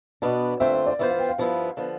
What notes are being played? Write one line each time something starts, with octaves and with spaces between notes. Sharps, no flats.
B2 B3 D4 D5
D3 A3 C4 F4 C5 E5
E5
D5
E3 B3 F4 C5 E5
F5
G5
F5
G2 F3 B3 E4
D3 F3 B3